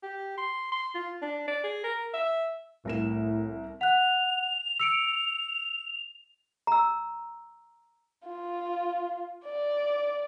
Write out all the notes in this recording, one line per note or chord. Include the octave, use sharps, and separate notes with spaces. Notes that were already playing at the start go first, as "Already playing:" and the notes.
G4
C6
C6
F4
D4
D5
G#4
A#4
E5
C2 A2 A#4 E7
F#5 F#6 F7
E6 C#7 D7
A#5 E6
F4
D5